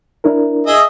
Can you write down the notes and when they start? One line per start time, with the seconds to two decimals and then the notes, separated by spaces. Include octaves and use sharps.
0.24 D4 E4 A#4
0.66 G#4 D#5 E5